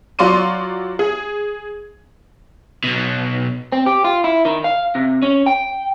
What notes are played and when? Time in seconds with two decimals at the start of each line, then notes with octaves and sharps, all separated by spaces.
0.19 F#3 F4 D5 C6 C#6 D#7
0.99 G#4
2.84 B1 B2
3.72 C4
3.86 G4
4.04 F4
4.24 E4
4.45 D#3
4.64 F5
4.95 C3
5.22 C#4
5.46 G5